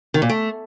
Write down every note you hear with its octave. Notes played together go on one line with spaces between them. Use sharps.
D#3
A#2
A3